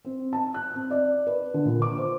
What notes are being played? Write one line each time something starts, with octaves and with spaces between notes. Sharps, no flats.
C4
A5
F#6
C4
D5
B4
D3
A#2
D6
C5